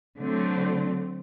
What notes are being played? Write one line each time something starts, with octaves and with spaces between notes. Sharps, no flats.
D3 F#3 A3 C4